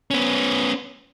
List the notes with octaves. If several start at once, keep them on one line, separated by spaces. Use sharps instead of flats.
B3 C#4